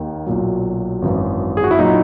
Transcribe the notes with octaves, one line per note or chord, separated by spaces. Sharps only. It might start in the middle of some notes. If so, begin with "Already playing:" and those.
Already playing: D#2 D#3
B1 A#2 F#3
G#1 F#2 E3
G#4
F#4
E4
A#2 F#3 D#4